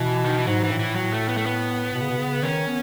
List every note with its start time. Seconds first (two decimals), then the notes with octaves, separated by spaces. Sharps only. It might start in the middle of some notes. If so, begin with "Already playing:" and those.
Already playing: B2 E3
0.24 D#3
0.36 E3
0.47 G#2 F#3
0.64 E3
0.71 A2
0.80 E3
0.96 F#3
1.12 A3
1.29 B3
1.37 A3
1.46 B3
1.94 B2
2.02 C#3
2.10 B2
2.18 C#3
2.42 D#3 C#4
2.67 B3